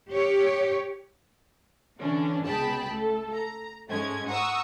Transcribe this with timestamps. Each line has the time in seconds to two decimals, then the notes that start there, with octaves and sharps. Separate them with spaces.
0.11 G4 C#5
2.00 D3 E3 C#4 D4
2.46 C#2 B2 G#4 G5 A5 B5
2.90 A3 A4
3.34 A#5
3.89 G#2 G#3 A3 C#4 G#6
4.27 F#5 A#5 C#6 D#6 E6